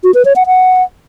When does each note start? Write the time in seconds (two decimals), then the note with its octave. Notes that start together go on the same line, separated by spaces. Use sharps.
0.04 F#4
0.14 B4
0.25 C#5
0.36 F#5
0.47 F#5